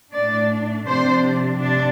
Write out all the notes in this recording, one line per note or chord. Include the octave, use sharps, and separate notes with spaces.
A2 A3 D4 D5
C3 F3 D4 C5
C3 D4